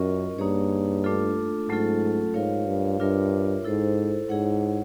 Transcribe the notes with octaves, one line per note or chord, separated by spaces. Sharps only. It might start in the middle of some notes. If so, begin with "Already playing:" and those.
Already playing: F#2 C#4 F4 A#4 D#5
G2 A#3 D#4 G#4 C#5
A3 D4 F4 A4
G#2 F#3 A3 C#4 F4 A4
G#2 F4 A#4 C#5 F5
G2
G2 D4 F4 A#4 C#5 E5
G#2 E4 A4 C5
G#2 E4 G#4 C#5 F#5